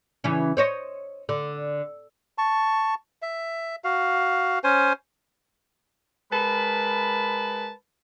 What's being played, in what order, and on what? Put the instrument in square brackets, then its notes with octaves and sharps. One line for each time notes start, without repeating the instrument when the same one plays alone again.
[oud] C#3 E3 C#4
C5 C#5 D#5
D3
[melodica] A5 C#6
E5
F#4 F5
C#4 C5 G#5
[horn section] G#3 A#4 B4 A5 B5